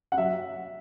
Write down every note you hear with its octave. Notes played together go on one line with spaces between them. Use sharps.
F#5
F#3 E5